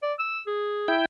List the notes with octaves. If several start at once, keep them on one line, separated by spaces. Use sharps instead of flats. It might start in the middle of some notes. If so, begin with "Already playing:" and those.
D5
E6
G#4
E4 G5